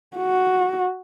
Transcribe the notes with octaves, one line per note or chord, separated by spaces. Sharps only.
F#4